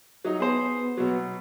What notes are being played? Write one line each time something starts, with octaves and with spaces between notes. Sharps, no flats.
F#3 D#4
B3 G#4 C5
B2 F#3